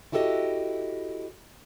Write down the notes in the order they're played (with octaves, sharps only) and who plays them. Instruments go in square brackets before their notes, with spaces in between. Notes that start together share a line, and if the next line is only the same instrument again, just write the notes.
[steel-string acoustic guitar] E4 F#4 G4 A4 B4 D#5